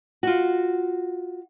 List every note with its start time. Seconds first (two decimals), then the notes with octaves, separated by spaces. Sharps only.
0.23 F4 F#4